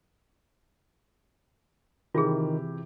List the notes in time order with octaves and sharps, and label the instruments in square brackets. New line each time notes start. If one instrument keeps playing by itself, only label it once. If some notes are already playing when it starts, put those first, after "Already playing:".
[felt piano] C3 E3 G4 [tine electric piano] D#3 [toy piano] F4 G#4